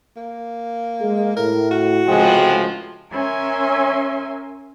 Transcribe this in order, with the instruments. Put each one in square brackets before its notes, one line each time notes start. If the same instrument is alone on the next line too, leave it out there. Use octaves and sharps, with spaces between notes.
[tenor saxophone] A#3
[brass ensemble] G#3 G#4
[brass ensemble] A2 [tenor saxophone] A#4
[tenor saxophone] F#4
[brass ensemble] C#2 C3 G5 [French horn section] A2 F3 G#3
[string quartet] C#4 A#4 E5 G#5 C6